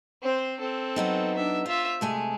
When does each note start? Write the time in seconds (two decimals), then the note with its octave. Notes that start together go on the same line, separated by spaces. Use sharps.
0.22 C4 C5
0.60 C4 A4
0.96 F#3 B3 D#4
1.36 D4 E5
1.66 F4 C5 E5
2.01 C3 G#3 A3 G#5